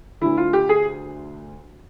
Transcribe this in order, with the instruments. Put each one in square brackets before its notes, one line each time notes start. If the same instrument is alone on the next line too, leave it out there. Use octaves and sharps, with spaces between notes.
[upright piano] D2 D3 E4
F4
G4
G#4